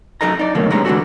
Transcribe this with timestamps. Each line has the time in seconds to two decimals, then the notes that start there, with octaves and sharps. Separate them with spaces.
0.21 F#2 D#4 A4 D#5 A#5
0.39 D#4 D5
0.55 B2 D3 D#3 F#3 A3 A#3
0.70 G2 G#3 B3 C#4 A#5
0.85 D3 E3 F3 G3 F#4 A4